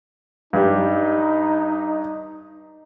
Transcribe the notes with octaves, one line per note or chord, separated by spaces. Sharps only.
G2 G3 D#4